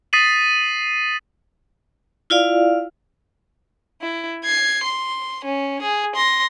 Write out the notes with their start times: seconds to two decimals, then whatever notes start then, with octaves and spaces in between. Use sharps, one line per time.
0.13 D#6 A6 B6 C7 D#7 F#7
2.30 E4 F4 D5 F5
4.02 E4
4.44 G#6 C7
4.84 C6
5.45 C#4
5.82 G#4
6.16 C6 A#6